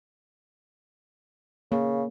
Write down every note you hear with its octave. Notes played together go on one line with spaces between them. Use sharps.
C#3 A#3